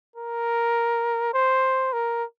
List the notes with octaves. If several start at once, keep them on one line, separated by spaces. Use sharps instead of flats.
A#4
C5
A#4